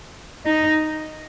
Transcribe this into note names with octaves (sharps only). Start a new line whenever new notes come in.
D#4